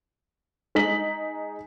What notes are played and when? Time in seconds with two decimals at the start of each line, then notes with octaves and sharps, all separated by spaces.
0.75 G#3 D#4 B6 F#7